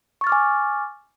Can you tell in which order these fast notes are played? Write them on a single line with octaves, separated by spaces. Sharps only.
C#6 A6 F6 D6 G#5